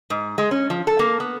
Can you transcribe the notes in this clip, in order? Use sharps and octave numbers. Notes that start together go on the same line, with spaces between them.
G#2
G#3
C#4
F3
A4
A#3
B3